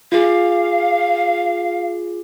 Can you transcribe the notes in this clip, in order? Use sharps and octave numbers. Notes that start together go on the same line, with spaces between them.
F4 G#4 F5